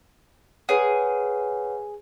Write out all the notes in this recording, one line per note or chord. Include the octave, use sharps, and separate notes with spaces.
G#4 B4 C#5 F#5